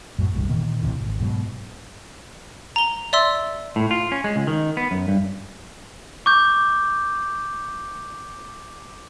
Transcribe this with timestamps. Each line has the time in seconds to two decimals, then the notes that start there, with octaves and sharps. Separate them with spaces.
0.19 F#2 A2 F#3
0.33 D#1 C2 G2
0.49 A#2 D#3 E3 A#3
0.82 A1 D2 C3 E3
1.00 G#1
1.20 G#2 B2 F#3
2.76 A#5 G7
3.13 D5 E5 C6 E6
3.76 A2
3.91 F4
4.12 C#4
4.24 G#3
4.36 C#2
4.47 D#3
4.77 B3
4.91 F#2
5.08 G2
6.26 C#6 D6 G6